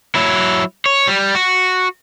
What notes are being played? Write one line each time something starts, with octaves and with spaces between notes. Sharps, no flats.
F#3 E4
C#5
G3
F#4